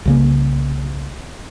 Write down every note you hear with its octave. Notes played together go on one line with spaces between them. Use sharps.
C2 C#3 A#3